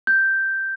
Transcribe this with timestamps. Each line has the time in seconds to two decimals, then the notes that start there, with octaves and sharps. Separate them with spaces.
0.07 G6